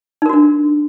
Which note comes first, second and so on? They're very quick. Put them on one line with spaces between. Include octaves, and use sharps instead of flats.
D#4 A#4 F#4 D4